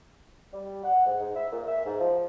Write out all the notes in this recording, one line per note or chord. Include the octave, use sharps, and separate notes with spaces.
G3
F#5
G#2
G#2
E5
A#2
E5
G#2
F3